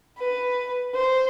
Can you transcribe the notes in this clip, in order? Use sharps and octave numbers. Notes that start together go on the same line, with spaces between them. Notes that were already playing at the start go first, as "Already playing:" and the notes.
B4
C5